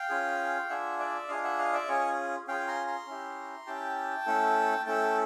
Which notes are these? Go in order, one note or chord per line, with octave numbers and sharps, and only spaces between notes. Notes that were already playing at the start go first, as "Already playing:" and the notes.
Already playing: F5 G5
C#4 F4 G#4
D4 F4 G#4 E5 F#5
D5 E5
D4 F4 G#4 D#5 F5
E5 F#5
D#5 F5
D5 E5
C#4 F4 G#4 C#5 D#5
C#4 F4 G#4 F5 G5
A#5 C6
A#5 C6
C#4 E4 G4
C#4 E4 G4 G5 A5
A3 C#4 E4 A4
A3 C#4 E4 A4 G5 A5